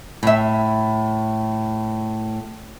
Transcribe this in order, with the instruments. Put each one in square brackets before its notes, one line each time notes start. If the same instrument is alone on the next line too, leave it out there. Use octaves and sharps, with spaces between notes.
[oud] A2 E5